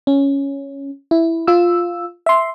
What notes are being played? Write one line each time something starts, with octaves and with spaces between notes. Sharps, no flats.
C#4
E4
F4 E6
E5 C6